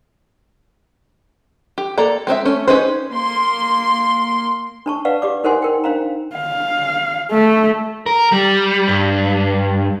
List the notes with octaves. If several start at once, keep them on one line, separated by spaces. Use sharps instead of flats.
G4
A#3 A4 D5 A#5
G#3 C4 A4 E5
A3 C#4
C#4 D#4 G#4 B4 C5
A#3 C6
D4 A5 C#6
B4 D5 F5 F#5
G4 D5 D6
D#4 A#4 C5 F#5 G#5 C6
D#4 A#4 G5
D4 C5 F5 A#5
F5
A3
A#4
G3
G2